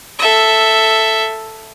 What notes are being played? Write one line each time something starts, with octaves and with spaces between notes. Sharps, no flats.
A4 E5